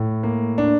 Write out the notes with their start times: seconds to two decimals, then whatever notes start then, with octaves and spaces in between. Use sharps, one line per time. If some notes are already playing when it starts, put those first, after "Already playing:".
Already playing: A2
0.23 A#3
0.58 D4